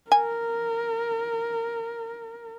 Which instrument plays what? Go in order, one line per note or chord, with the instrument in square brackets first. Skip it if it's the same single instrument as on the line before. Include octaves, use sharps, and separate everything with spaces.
[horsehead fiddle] A#4 [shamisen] G#5